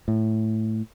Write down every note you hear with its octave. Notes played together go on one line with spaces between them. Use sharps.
A2